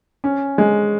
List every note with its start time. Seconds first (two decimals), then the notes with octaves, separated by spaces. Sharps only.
0.24 C#4
0.58 G#3